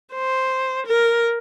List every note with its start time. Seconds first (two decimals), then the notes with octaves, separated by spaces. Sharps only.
0.14 C5
0.87 A#4